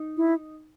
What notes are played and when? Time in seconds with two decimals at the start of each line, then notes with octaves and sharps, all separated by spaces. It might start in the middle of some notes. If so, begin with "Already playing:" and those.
Already playing: D#4
0.17 E4